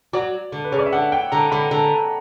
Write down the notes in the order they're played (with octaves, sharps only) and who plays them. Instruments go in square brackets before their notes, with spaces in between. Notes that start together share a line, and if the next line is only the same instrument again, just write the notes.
[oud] F#3 [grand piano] D5
[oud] D3
[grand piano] B4
[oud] C#3 [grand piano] C#5
[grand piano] D5
E5
[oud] D3 [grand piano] F#5
[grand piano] G5
[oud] D3 [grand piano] A#5
[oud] D3 [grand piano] B5
[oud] D3